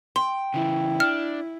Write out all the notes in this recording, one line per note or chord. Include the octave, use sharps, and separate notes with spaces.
G5 C6
C#3 E3 E4
D4 F6